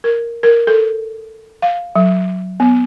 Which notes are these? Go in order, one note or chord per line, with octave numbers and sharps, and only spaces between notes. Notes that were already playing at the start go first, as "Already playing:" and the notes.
A#4
A#4
A4
F5
F#3
B3